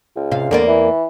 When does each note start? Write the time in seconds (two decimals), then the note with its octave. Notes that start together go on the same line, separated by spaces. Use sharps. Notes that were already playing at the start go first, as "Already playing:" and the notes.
0.16 C#2
0.31 C3 F5
0.51 E2 D3 A#3 D5
0.68 E3